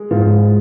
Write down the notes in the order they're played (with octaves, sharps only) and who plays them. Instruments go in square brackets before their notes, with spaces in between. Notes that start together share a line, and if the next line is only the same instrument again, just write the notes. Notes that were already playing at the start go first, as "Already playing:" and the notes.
Already playing: [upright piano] G#3
[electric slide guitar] G#2 [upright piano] F3 F4